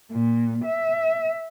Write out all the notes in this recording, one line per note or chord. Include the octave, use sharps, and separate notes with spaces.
A#2
E5